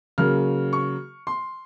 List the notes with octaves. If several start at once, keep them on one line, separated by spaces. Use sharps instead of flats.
C#3 F#3 A#3 F6
C#6
C6